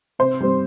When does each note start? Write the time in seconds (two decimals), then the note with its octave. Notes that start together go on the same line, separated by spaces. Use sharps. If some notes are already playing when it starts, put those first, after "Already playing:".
0.19 C3 C5
0.41 G3 C4